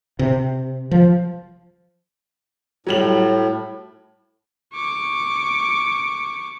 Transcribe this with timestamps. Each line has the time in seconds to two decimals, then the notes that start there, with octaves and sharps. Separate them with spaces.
0.19 C3
0.91 F3
2.87 A2 F#3 G3 F#7
4.74 C#6 D6